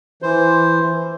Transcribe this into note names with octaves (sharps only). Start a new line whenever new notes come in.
E3 C5